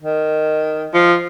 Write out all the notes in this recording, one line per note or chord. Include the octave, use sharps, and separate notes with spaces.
D#3
F3